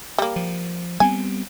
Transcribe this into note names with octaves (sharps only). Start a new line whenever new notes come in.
G3 A#3
F3
G3 B3 C4 G#5